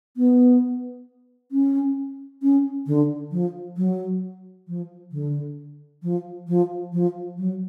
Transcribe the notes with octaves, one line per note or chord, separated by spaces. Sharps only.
B3
C#4
C#4
D3
F3
F#3
F3
D3
F3
F3
F3
F#3